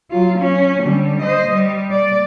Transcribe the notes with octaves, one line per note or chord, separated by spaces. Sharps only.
F#3 F4
C#4
D3 G3
C5 D#5
G3
D5